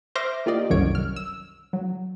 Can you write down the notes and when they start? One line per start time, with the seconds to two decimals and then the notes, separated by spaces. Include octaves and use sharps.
0.15 C5 E5 C6 D6 F6 A#6
0.46 A#3 F4 G4 D5 D#5
0.70 G1 C2 F#2 D#3 C#5 D7
0.95 F6
1.16 E6
1.73 F#3